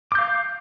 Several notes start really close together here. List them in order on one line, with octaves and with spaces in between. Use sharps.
D6 G6 F5